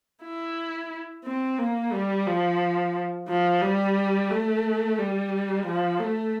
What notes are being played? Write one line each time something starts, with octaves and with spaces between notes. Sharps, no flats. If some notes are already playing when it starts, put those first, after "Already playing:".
E4
C4
A#3
G3
F3
F3
G3
A3
G3
F3
A3